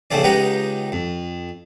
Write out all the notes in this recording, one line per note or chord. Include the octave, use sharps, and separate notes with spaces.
A#1 C#3 A3 C4 D5
C#2 B3 D#4 G4 F#5 A#5
F2